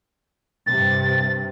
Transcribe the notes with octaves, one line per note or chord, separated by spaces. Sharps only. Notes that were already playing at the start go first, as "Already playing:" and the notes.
G2 C3 A6